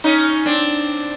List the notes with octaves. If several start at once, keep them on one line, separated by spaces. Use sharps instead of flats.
C#4 D#4
C4 D4